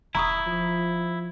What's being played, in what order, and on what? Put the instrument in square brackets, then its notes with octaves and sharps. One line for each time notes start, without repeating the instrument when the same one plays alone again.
[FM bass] E1 [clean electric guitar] E4 [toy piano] A#5 C#6 D#6
[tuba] F3